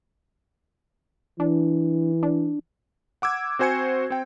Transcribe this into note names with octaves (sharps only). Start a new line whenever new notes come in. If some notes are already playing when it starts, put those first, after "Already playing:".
E3 D4
D4
F#5 D6 E6 G#6
C4 F#4 C5 G#5 G#6 C#7
C4 G5